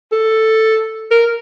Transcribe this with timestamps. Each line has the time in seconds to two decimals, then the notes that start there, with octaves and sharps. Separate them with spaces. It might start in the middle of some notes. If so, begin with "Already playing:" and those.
0.12 A4
1.11 A#4